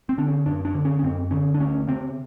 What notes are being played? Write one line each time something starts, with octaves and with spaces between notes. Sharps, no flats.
C4
D3 D4
C#4
F#2 D4
D4
D3
C#4
C#4
F#2 C4
D3 C#4
D4
D2 C#4
C#3 C4